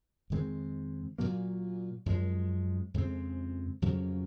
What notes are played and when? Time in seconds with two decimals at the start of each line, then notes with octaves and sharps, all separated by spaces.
0.30 F2 D#3 G#3 C4
1.18 A#2 F#3 A#3
2.06 F#2 F3 G#3
2.94 F2 C#3 G#3 C4
3.82 F2 C#3 F#3 A#3